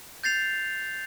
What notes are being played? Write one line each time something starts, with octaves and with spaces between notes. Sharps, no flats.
G6 A6 C7 F7